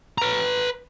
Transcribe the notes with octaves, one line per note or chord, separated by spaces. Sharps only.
B4 A#5